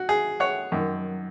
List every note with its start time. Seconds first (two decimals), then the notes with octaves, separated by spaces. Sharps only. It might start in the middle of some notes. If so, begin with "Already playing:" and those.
Already playing: F#4
0.09 G#4
0.40 C#5 F#5
0.72 F#2 D#3